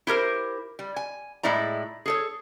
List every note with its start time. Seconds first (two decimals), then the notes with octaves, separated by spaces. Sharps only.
0.07 E4 G4 A#4 C5
0.79 G3
0.96 G#5
1.43 A2 G#3 E4 D5 A#5
2.06 G#4 A4 C#5